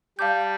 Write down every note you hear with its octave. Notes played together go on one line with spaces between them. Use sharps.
G3 F5 A5 D6 G6